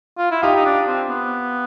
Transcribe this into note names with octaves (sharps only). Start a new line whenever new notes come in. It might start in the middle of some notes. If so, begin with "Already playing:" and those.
F4
E4
D#4 F4 G4
D#4
D4
C4
B3